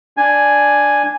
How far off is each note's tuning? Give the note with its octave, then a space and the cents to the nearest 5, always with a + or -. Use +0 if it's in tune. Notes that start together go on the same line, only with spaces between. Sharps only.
D4 +0 G#5 +0